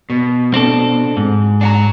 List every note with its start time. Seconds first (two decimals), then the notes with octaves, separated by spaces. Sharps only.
0.10 B2
0.54 C4 D4 A4
1.17 G#2
1.61 D4 F#5 A#5